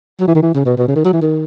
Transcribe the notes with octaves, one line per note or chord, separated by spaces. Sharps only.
F#3
E3
D#3
E3
C#3
B2
B2
C#3
D#3
F#3
E3
D#3